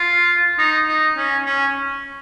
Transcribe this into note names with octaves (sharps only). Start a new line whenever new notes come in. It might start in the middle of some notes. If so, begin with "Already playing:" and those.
Already playing: F4
D#4
D#4
C#4
C#4